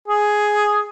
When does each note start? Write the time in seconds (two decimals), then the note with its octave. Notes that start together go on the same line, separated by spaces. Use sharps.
0.08 G#4